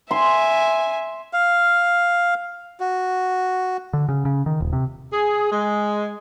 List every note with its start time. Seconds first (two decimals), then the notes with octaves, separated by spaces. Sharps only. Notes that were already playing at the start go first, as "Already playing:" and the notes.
0.11 E5 G#5 C6
1.33 F5
2.80 F#4
3.93 D3
4.09 C#3
4.25 C#3
4.46 D#3
4.60 D#1
4.73 C3
5.12 G#4
5.51 G#3